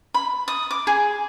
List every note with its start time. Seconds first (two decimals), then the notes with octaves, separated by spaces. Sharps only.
0.14 B5
0.48 D#6
0.71 D6
0.87 G#4